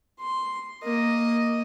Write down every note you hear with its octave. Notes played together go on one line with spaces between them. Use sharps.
C6
A#3 D#5